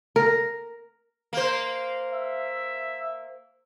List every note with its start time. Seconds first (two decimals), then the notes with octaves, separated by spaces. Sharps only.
0.16 A#4
1.33 A#3 C5
2.13 E5